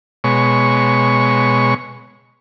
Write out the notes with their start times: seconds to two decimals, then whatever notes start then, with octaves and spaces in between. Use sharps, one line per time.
0.24 B2 G#3 C#5 C#6